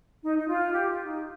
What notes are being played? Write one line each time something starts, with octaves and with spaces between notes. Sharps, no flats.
D#4
D#4
F4
G4
F4
D#4